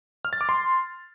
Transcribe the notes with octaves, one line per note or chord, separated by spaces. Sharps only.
F6
A6
D6
C6